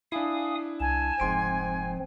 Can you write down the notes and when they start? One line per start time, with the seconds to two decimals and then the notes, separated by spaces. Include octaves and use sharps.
0.12 D4 E4 F5 G#5 D#6
0.80 C2 G#5 A5
1.20 F1 G#2 F3 C4 C6 D7